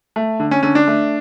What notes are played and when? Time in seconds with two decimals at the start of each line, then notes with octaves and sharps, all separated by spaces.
0.16 A3
0.40 D3
0.51 C#4
0.63 D3 C#4
0.75 D4
0.87 A3